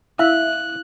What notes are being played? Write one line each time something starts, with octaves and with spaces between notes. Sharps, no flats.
E4 E5 F5 F#6